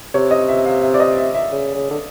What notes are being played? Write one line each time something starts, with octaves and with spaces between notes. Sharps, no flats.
C3 C#5
D#5
E5
F5
E5
D5
D#5
E5
E5
C#3
C#3
D3